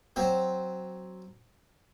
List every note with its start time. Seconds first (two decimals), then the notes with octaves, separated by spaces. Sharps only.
0.16 F#3 C4 C5